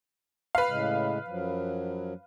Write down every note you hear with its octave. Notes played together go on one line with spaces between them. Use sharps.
B4 F5
A2 C#3 G#3
F#2 F3 F#3